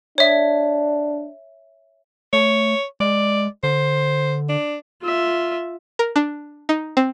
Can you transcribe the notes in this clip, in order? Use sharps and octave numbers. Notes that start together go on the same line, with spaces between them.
D4 C#5 E5
A3 C#5
G#3 D5
D3 C5
D4
F4 E5
A#4
D4
D#4
C4